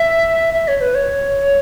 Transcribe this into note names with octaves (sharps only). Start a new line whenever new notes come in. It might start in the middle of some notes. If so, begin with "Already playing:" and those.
Already playing: E5
E5
C#5
B4
C#5